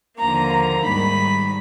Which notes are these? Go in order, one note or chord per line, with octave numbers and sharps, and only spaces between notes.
D#2 D3 F3 A#3 A#5
A#5
G#2 D#3 G3 B5